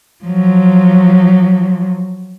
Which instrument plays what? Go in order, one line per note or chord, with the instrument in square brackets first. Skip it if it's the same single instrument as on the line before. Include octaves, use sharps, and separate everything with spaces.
[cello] F3 F#3